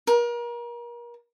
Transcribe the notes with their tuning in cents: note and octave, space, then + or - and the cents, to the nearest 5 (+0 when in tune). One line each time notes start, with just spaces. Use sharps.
A#4 +35